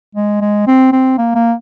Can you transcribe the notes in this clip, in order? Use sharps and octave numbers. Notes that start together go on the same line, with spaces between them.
G#3
G#3
C4
C4
A#3
A#3